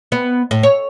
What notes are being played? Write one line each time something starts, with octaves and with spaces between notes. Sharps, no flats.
B3
A2
C#5